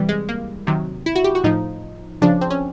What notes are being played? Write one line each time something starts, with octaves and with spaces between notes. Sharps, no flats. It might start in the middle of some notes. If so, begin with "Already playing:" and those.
Already playing: C3 E3 G3
G#3
A#3
C3 D#3 F#3
E4
F#4
G4
F#4
A2 F3 D#4
C#3 F3 D4
C4
C#4